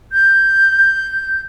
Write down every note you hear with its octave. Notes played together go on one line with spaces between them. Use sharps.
G6